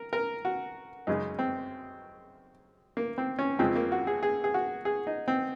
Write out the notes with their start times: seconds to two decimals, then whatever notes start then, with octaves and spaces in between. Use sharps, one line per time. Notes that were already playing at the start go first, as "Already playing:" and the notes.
Already playing: A#4
0.13 A#4
0.45 F#4
1.07 F#2 C#3 G#3 D#4
1.39 C4
2.97 A#3
3.18 C4
3.39 C#4
3.59 F2 C#3 F3 G#3 C4
3.76 A#3
3.92 F#4
4.07 G#4
4.23 G#4
4.44 G#4
4.54 F#4
4.85 G#4
5.07 D#4
5.28 C4